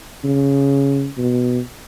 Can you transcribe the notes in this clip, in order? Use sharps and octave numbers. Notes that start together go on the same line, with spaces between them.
C#3
B2